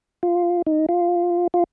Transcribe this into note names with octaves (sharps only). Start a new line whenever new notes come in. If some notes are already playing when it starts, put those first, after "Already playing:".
F4
D#4
F4
F4